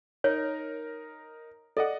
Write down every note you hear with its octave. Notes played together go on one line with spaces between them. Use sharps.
D#4 A#4 C#5
A4 D5 D#5 F#5